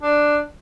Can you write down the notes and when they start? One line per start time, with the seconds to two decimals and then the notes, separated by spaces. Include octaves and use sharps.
0.02 D4